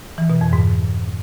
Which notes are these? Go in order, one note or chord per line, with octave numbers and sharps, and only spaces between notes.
E3
B2
F2
G#2